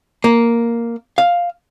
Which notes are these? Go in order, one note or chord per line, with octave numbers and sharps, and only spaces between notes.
A#3
F5